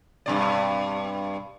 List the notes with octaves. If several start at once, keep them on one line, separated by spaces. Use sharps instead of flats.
G2 B2 D5